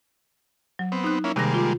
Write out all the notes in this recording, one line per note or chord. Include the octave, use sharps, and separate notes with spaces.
F#3
B3 C4
D#4 F#6
A#3 C#4 E4
C3 D#3 G3 G#3 A#3 A#6
F4